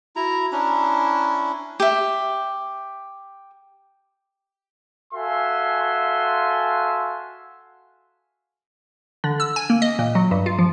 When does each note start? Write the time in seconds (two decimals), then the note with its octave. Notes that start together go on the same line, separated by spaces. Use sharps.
0.16 E4 F#4 A#5
0.52 C#4 D4 E4 A#5
1.80 G4 E5
5.13 F#4 A4 E5 F5 G#5 C6
9.24 D3
9.40 E6
9.56 G#5
9.70 A#3
9.82 D#5
9.99 A#2
10.15 F#3
10.31 G2
10.46 F4
10.59 F3